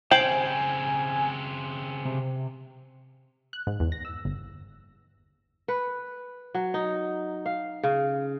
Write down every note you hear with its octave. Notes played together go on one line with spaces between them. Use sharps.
C#3 C4 C5 G5 G#5 C7 F#7
C3
F#6
G#2
E2
A#6
E6
G1
B4
F#3
D#4
F5
C#3